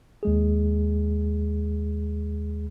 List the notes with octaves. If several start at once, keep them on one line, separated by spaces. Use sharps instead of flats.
D#2 G#3 G#4